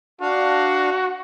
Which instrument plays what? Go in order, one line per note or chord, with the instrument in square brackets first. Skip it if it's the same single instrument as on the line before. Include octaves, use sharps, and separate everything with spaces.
[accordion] D4 F5 [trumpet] F#4